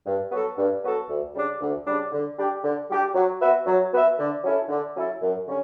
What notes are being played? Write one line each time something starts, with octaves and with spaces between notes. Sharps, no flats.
G2
F#3 B3 F#4 A4
G2
F#3 B3 F#4 A4
D2
C#3 G3 D4
D2
C#3 G3 D4
D3
G3 D4 G4
D3
G3 D4 G4
F#3
B3 F#4 B4 E5
F#3
B3 F#4 B4 E5
D3
F#3 C#4 E4 A4
D3
F#3 C#4 E4 A4
F#2
D3 G3 C#4